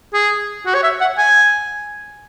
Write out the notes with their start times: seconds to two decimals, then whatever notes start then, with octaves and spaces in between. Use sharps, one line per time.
0.14 G#4
0.66 F#4
0.74 C#5
0.83 E5
1.01 F#5
1.18 G#5